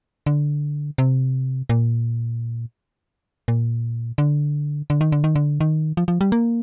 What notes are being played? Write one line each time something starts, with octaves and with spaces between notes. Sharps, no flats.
D3
C3
A#2
A#2
D3
D3
D#3
D3
D#3
D3
D#3
F3
F3
G3
A#3